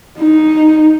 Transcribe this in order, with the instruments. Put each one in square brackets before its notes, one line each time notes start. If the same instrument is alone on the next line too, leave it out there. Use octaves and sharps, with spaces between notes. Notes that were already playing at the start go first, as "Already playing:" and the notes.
[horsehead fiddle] D#4